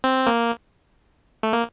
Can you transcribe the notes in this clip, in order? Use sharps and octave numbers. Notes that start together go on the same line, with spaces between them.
C4
A#3
A3
A#3